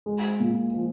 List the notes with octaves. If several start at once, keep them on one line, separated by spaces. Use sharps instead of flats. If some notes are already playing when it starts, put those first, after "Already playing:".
G#3
A#2
F3